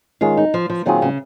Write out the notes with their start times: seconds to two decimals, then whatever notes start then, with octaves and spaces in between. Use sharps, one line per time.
0.21 D#3 G#3 C#4 F4
0.37 D#4
0.54 F3
0.70 F3
0.86 A#2 D#3 F#3 C4 F4 G#4
1.02 C#3